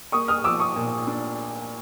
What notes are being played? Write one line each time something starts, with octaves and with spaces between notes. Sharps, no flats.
A#3 C#6 D#6
D#6 F6
F3 D6 E6
C#6 D#6
A#2
D4